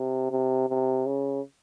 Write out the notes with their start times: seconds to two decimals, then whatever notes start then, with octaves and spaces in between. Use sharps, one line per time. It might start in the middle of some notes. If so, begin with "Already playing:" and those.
Already playing: C3
0.31 C3
0.69 C3
1.07 C#3